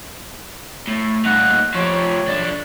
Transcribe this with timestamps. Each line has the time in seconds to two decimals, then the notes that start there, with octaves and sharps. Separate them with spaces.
0.87 A2
1.26 A#2 D#4 F#5
1.75 F3 G4 C#5
2.27 B1 D4